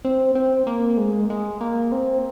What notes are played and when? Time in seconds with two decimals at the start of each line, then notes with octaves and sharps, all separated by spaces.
0.05 C4
0.35 C4
0.67 A#3
0.98 G#3
1.30 G#3
1.61 A#3
1.92 C4